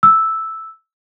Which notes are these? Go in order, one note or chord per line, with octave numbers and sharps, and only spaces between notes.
E6